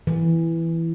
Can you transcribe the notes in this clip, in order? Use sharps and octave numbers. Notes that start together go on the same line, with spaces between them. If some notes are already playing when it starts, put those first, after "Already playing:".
E3